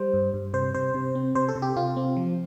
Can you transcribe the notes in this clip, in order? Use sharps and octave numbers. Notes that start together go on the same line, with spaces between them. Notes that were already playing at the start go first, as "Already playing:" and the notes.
Already playing: G3 C5
G2
G2
C3 C5
C3 C5
C3
C4
C3 C5
A4
C3
G4
C3 F4
C4
F3